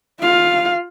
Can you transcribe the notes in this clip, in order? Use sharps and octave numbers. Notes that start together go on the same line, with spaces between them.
F4 F5